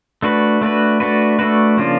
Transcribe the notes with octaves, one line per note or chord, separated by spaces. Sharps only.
A3 D4 F#4 B4
A3 D4 F#4 B4
A3 D4 F#4 B4
A3 D4 F#4 B4
C#3 F3 A#3 D4 F4